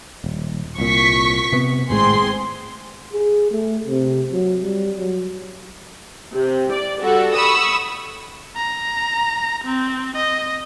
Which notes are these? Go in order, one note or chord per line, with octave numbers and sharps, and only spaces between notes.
D#1
C2 A#2 C#6 B6
C3 B3
G#1 A2 G#3 C4 G#4 C6
G#4
A3
C3
F#3
G3
F#3
C3
D5
G3 F#4 A4
B5 C#6 D#6 E6
A#5
C4
D#5